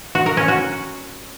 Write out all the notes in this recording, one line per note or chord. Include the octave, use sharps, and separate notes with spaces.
F#4
A#4
C#4
F#4